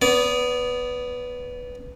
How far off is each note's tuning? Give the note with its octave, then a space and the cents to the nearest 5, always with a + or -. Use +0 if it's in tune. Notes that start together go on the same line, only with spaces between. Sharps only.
B3 +0 D5 -40